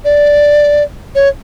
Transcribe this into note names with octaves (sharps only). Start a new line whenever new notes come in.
D5
C#5